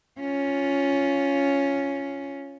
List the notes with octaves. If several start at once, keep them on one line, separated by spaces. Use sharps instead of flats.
C#4 F4